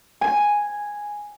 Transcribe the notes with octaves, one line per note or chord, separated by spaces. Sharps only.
G#5